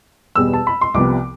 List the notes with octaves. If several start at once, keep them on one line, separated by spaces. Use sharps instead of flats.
E2 B2 G3 B3 E6
A5
B5
C6
C2 C3 F3 B3 D6